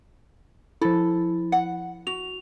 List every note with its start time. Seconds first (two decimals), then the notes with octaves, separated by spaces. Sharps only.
0.82 F3 E4 A4
1.52 F#5
2.07 F#4 F7